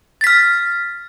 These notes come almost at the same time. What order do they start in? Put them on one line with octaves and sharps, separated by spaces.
A6 B6 F6